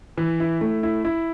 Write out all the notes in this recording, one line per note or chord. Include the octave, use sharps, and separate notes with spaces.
E3
E4
A3
E4
E4